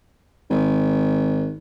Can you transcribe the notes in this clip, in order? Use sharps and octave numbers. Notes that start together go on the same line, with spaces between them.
G#1